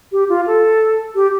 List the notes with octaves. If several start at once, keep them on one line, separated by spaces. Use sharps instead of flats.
G4
F4
A4
G4